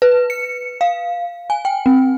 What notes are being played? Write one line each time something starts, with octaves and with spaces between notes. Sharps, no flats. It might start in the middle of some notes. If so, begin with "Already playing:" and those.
B4
C#7
F5
G#5
G5
C4